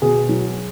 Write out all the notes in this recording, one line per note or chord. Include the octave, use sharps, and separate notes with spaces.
B2 G#4
F#3